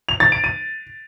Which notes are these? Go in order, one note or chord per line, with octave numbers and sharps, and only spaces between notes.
F7
A6
D7
D#7